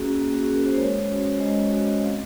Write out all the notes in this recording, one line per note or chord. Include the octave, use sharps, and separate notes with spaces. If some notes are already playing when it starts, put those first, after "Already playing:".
Already playing: A#3 C#4 F#4 G#4
A#3
F#4
C#4 F#4 G#4
A#4
C5
G#3 C#5
C#4 F#4
G#3 D#5
C#4 F#4 D#5
C4 F5